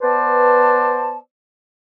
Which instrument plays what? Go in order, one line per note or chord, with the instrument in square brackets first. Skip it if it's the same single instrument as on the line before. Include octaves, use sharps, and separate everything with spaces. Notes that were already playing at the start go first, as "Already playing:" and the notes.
[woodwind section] B3 B4 C5 D5 A5